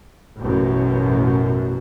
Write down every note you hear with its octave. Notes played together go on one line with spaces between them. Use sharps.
A1 F#2 B2